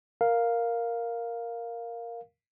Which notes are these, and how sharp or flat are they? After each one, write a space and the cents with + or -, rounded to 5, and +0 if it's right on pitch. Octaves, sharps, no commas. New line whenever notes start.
A#4 +0 F5 +0